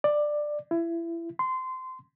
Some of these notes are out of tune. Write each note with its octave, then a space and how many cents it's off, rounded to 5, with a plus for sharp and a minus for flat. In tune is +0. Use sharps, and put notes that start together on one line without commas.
D5 +15
E4 +25
C6 -20